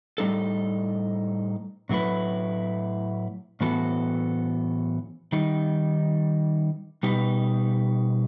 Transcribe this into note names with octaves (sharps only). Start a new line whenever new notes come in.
A2 G3 B3 D#4 A4
A2 F#3 A3 E4 B4
A2 E3 B3 F#4 A4
D#3 G3 D#4
B2 G3 D#4 G4 B4